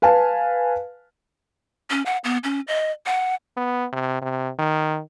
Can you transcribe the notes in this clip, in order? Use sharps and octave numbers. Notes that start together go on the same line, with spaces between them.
B4 F5 G#5 A5
C#4
F#5
B3
C#4
D#5
F#5
B3
C3
C3
D#3